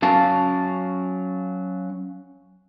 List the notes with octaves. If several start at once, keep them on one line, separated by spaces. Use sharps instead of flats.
F#3 C#4 F5 A5